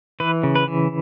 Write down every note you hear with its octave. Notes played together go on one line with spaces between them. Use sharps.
E3 B4
C#3
B4
E3